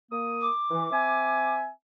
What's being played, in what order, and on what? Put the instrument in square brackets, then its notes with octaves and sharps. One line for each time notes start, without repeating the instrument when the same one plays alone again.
[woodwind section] A#3 D#6
[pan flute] D6
[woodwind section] E3
C4 E5 G#5